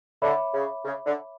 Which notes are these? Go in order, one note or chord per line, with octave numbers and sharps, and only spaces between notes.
D3 C#5 E5 B5 D6
C#3
C#3
D3